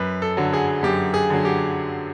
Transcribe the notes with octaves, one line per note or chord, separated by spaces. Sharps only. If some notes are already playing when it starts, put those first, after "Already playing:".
Already playing: F#2 B4
A4
D3 F#3
G#4
F#2 G4
G#4
D3 F#3
G4